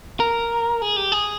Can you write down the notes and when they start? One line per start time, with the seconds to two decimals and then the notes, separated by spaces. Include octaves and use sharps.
0.20 A#4
0.82 G#4
0.96 G4
1.12 G#4